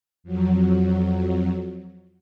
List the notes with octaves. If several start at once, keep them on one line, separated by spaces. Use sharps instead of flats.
F2 F#3